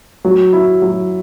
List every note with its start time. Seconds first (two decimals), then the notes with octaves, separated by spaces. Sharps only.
0.25 F#3
0.53 E4
0.82 F#3